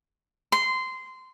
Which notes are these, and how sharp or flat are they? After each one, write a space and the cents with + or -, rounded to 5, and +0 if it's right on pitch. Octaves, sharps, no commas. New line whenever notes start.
C6 -15